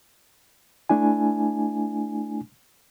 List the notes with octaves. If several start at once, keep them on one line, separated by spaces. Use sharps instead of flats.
A3 D4 E4 G#5